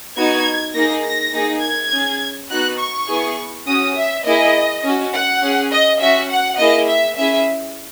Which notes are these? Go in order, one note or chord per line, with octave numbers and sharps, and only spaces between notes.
B3 D#4 F#4 G#6
A#3 D#4 G#4 A#6
A#6
A#3 D#4 G#4
G#6
C#4 G#4
B3 D#4 F#4 F#6
C#6
B3 E4 G#4
C#4 F#4 D#6
E5
A#3 E4 G#4 D#5
C#4 F#4
F#5
C#4 G#4
D#5
C#4 F#4 E5
F#5
A#3 E4 G#4 D#5
E5
C#4 E4 G#4 E5